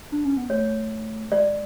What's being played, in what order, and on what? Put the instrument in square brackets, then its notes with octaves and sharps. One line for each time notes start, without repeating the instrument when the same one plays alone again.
[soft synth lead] D4
C#4
B3
[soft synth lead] A3 [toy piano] C#5
[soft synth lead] G#3 [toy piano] D5